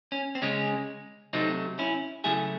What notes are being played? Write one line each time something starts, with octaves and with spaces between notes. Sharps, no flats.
C#4
C4
C#3 G#3 C#4
C3 F#3 A3 C4 D#4
C#4 E4
C#3 F#3 A3 E4 G#4